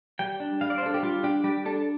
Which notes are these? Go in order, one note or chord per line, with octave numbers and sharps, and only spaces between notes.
G3 G5
D4
G3 F5
D5
C5
D4 A4
G4
G3 F4
D4 G4
G3 G4
D4 A4